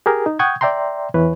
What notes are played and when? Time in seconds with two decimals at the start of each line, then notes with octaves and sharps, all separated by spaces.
0.06 G4 G#4 A#4
0.26 D#4
0.39 F#5 G5 C#6 D#6 G6 G#6
0.61 D5 E5 G5 A#5 C6
1.14 E2 E3 B4 C#5